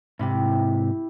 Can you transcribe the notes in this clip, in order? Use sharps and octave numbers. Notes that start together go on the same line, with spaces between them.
G#2 C3 E4 G4